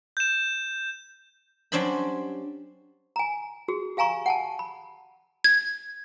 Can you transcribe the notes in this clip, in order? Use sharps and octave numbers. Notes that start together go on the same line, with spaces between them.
G6 E7
F#3 G3 C#4 D4 C5 B5
G#5 A#5
F#4 G#4
G4 F5 G#5 A#5 C#6
F#5 G#5 A5
B5
G#6